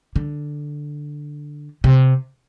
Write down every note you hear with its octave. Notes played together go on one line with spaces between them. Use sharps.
D3
C3